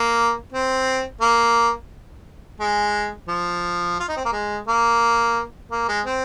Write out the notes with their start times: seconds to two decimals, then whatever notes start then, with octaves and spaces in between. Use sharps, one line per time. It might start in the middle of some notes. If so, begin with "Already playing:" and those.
Already playing: A#3
0.53 C4
1.21 A#3
2.60 G#3
3.28 F3
4.00 F4
4.09 D#4
4.17 C4
4.25 A#3
4.33 G#3
4.68 A#3
5.71 A#3
5.88 G#3
6.06 C4